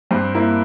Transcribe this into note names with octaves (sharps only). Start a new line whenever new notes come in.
G2 C4
A#3 E4